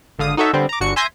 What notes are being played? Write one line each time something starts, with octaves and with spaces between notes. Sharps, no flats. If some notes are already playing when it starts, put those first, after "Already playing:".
G#1 D3 F5 D#6
D#4 F#4 A4 C#5 E5
D3 G3 B3 C4
A#5 D6
G1 D3 F#4 C#6 C#7
E5 G#5 C6 G6 G#6 A#6